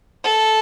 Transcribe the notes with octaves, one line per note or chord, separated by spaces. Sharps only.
A4